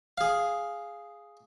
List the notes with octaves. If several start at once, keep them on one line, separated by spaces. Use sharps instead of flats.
G#4 F5